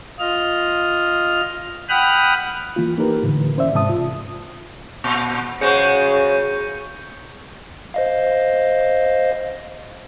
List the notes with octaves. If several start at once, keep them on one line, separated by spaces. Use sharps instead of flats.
F4 D#5 F6
F#5 G5 B5 D#6 F6 F#6
E3 A#3 F4
A#3 D#4 G4 A#4 B4
A2 D3 E3
E3 C#4 C5 D5 E5
G#2 C3 G#3 E5 A5 D#6
F4
A#2
C#3 G#3 F#4 C5 C#6 G6 C#7
C5 D#5 F5